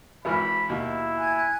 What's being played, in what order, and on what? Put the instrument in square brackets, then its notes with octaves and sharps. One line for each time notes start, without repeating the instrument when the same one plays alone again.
[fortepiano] G#1 E3 F6 [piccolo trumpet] B5
[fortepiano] D#2 B2 [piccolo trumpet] E4
[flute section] G#5 F#6 G#6